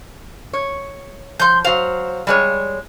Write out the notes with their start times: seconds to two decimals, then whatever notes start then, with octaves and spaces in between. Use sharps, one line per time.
0.53 C#5
1.40 F3 C6 G6
1.65 F#3 C5 F5
2.27 G3 G#3 C#5